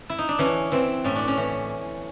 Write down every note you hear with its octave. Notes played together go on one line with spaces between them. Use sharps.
E4
D#4
D4
E3 C#4
E3 C4
A2 C#4
D4
C#4
E3